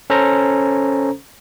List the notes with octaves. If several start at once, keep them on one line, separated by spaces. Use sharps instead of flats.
C#4 A4 C5 A#5